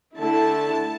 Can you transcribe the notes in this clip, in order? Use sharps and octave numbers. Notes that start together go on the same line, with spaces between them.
D3 A3 E4 A5